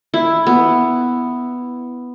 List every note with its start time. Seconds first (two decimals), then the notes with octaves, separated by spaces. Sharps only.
0.14 E4
0.47 B3